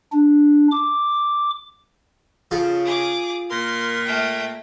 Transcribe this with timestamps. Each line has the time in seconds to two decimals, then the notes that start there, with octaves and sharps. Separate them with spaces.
0.12 D4
0.72 D6
2.51 C#3 F3 A4
2.85 G#4 D6
3.50 A#2 A#4 C6
4.04 A3 G5